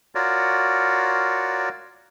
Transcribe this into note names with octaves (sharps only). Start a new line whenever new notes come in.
F4 F#4 A#4 C#5 D5